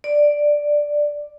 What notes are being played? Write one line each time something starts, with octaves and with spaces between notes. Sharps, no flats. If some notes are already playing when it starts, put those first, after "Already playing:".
D5